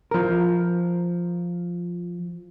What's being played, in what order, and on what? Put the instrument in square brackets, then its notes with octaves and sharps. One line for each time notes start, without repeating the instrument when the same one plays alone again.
[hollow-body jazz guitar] F3 A#4